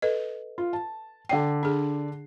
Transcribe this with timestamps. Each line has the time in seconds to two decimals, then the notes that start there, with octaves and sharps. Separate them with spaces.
0.02 A4 B4 D#5
0.58 F4
0.73 A5
1.29 D3 D5 G5 C7
1.63 D4 G#4